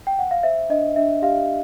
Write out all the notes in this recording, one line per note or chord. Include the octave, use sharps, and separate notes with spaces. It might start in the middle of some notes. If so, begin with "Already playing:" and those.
G5
F#5
F5
C5 E5
D4 D#5
D4 E5
G4 F5